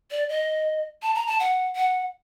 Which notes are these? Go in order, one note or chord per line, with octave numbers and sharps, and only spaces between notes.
D5
D#5
A5
A#5
A5
F#5
F#5